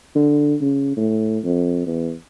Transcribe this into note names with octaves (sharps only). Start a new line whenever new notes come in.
D3
C#3
A2
F2
E2